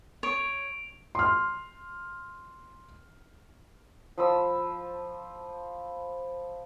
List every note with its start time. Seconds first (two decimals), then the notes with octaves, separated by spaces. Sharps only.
0.23 C#5 D7 F7
1.15 C6 F6
4.18 F3 B5 E6